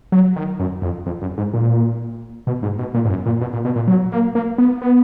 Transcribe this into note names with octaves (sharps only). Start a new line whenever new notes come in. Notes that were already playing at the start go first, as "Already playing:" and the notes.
F#3
D#3
F#2
F2
F2
F#2
G#2
A#2
B2
G#2
B2
A#2
G#2
F#2
A#2
B2
A#2
B2
A#2
F#3
A#3
A#3
B3
B3